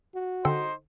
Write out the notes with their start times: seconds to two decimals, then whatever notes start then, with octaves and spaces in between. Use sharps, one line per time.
0.15 F#4
0.45 D3 D#4 A4 C5 G5